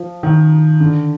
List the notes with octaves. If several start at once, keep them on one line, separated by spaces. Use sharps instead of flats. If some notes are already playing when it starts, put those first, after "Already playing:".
Already playing: F3
D#3
D3